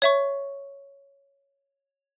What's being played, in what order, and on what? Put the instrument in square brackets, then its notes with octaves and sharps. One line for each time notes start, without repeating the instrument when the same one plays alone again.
[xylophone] C#5 E5 C#6